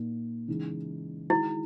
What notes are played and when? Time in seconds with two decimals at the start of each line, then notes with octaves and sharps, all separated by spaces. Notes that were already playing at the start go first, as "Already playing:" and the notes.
Already playing: A#2 A#3 D#4
0.48 C#3 E3 G#3 D#4
1.30 D#3 G#3 D#4 E4 F#4